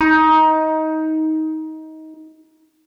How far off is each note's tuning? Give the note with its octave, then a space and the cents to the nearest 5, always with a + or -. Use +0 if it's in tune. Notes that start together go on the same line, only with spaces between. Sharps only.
D#4 +20